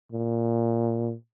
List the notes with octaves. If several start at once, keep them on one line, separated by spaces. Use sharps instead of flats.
A#2